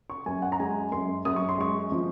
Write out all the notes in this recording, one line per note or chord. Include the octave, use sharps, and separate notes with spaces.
C#6
F#2 G#5
F#5
A#5
G#3 G#5
F#2 C6
F#2 D#6
C#6
C6
G#3 C#6
F3